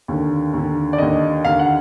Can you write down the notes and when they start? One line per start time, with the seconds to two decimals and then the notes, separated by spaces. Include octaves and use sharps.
0.08 D#2 D3
0.54 D#2 D3
0.93 D5
0.98 D#2 D3 D#5
1.45 D#2 D3 F5
1.59 F#5